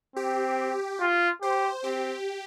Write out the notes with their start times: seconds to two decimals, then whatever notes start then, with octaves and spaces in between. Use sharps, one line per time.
0.16 C4 G4
1.00 F4
1.42 G4 C5
1.84 C4 G4